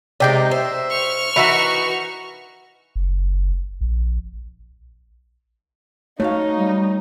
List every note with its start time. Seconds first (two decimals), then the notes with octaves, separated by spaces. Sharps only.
0.20 C3 G#3 D#4 D5 G5
0.51 C5 E5
0.91 C#6 F6
1.36 E3 D#4 F#4 A#4 E5 B5
2.96 F#1
3.81 A#1
6.20 A3 D#4 F#4 C#5 F5
6.59 G3